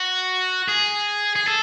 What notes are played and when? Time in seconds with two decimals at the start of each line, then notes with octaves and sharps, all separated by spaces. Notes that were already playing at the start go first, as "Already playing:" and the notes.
Already playing: F#4
0.68 G#4
1.36 G#4
1.48 A4